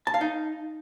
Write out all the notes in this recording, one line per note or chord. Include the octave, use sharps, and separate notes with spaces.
A5
F5
D#4